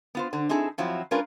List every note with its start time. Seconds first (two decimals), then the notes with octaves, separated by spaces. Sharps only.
0.15 B3 F4 C5
0.33 D3 C5
0.49 C4 D#4 E4 G#4 A4
0.78 F2 F3 F#3 C4 E4
1.11 G#3 C#4 D4 F4 A#4 B4